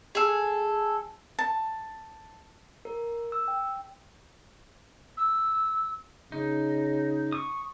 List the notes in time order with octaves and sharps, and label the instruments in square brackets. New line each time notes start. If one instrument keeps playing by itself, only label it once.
[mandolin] G#4 A4
[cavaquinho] A5
[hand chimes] A#4
E6
G5
[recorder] E6
[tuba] C#3 [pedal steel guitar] D#4
[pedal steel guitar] C#6 D#6